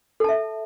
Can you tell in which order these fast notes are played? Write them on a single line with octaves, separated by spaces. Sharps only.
A4 A5 E5